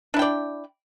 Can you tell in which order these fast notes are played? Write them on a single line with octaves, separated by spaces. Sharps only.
D4 E4 G5 D5